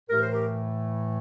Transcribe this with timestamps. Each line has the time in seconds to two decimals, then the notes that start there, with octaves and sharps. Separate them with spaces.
0.09 A2 E3 A3 G4 A#4
0.22 C5
0.31 G4 A#4